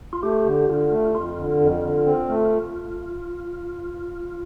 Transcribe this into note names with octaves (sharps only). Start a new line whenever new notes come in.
F4
A3 G4
D3
D3 F4
A3
F2 F4
D3
F2
D3
C4
A3